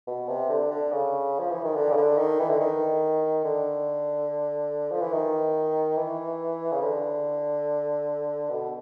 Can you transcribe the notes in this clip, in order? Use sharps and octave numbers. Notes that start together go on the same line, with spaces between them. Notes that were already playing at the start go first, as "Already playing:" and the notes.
B2
C3
D3
D3
C#3
F3
E3
D#3
D3
C#3
D3
D#3
E3
D3
D#3
D3
F3
E3
D#3
E3
C#3
D3
B2